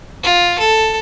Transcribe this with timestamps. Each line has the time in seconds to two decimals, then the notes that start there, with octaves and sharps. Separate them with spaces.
0.23 F4
0.59 A4